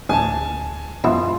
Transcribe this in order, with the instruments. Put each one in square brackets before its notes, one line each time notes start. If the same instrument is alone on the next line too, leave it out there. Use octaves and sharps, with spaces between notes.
[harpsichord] A1 [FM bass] D2 [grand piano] G#5 A5
[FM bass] F#2 [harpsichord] B2 E3 E4 [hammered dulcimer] F4